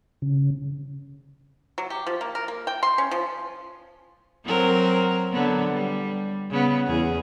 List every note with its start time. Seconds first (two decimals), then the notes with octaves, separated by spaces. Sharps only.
0.22 C#3
1.78 F#3
1.90 G4
2.06 F3
2.21 A#3
2.35 A#4
2.48 A#3
2.67 G5
2.83 C6
2.98 C#4
3.11 F3
4.45 F#3 C4 A#4
5.32 D3 F#3 B3
5.73 G3
6.50 C#3 B3
6.87 E2 G#4